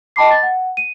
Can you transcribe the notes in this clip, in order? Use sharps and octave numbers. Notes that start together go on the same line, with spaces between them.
D#5 G5 A5 B5 D6 C7
A6
F#5
D#7